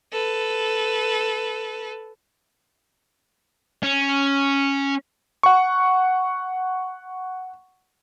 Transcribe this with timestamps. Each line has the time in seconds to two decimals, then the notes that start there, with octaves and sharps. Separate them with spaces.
0.11 A4 B4
3.83 C#4
5.43 F#5 C#6